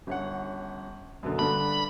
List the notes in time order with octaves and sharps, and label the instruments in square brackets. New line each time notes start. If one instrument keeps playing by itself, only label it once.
[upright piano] G1 C#4 F#5
F#2 B2 D3
[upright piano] G2 D3 D4 [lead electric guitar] B5